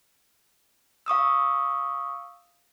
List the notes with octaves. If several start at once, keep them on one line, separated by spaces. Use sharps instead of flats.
F5 C#6 D#6 E6